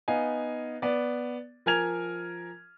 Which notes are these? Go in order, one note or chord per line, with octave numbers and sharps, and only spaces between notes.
B3 D#4 F5 G#5
B3 D5
F3 A#4 G#5 F6 G#6 F7